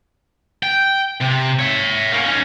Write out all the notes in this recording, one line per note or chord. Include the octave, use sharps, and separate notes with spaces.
G5
C3
C#5 E5
A#3 C#4
C#4 D#4